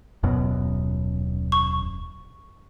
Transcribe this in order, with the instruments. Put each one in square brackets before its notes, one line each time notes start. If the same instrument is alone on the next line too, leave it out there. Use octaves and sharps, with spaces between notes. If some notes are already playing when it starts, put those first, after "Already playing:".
[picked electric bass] D#1 F#2 B2
[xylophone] C#6